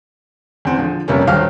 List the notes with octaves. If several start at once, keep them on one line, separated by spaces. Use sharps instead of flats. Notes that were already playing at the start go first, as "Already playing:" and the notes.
E2 C4
D3 F3
F1 C3 G3 A#3 C#4
D#1 G2 F#3 F5 G5 F6